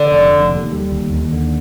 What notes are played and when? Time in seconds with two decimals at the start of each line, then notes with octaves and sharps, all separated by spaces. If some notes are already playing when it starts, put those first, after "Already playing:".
Already playing: D3
0.12 F1
0.31 F1
0.51 D#2
0.72 G3
0.92 D#2
1.13 D#2
1.32 D3